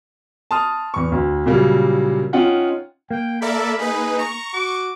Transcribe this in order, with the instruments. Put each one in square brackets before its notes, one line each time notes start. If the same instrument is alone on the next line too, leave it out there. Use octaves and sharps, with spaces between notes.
[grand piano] A5 C6 D#6 F6
E2 C#6
D2
A#2 C#3 F#3 G3 A#3
C#4 D#4 F4 F#5 G5
[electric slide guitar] A#3 [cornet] G5
[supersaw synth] A4 D5 E5 [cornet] A#4 [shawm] B5
[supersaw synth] D#4 B4 [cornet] G#4
[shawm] A#5 [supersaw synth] C#6
[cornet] F#4 [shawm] D6